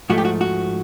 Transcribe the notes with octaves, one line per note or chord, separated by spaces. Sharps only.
G#2 F3 A3 F#4
G4
F#4
F#4